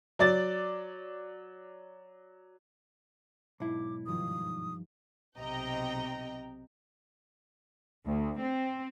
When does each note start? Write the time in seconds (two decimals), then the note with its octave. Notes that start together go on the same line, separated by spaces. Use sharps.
0.19 F#3 D5 A6
3.60 B1 G#2 E4 D6
4.06 G2 D#3 F3 D#6
5.37 B1 C3 D#5 G5 A#5
8.05 D2
8.39 C4